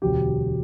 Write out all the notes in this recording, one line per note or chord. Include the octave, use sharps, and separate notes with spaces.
E1 D2 D3 F#3 G4